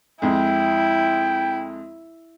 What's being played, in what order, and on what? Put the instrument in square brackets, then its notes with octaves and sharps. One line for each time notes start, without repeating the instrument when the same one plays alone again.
[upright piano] F2 G#3 [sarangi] E4 [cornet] G5